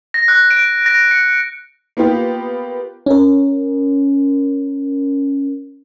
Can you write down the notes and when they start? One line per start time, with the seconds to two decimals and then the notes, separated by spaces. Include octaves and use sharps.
0.14 A#6
0.28 F#6
0.51 D7
0.86 A#6
1.11 C#7
1.97 A#3 B3 F4 G4
3.06 C#4 A#4